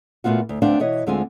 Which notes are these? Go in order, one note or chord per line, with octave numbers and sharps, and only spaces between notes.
A#2 A3 B3 F4 F#4
D2
D2 A3 B3 C4 D4 F5
B2 E3 C#5 D#5
D2 D3 G#3 C4 F4 G#5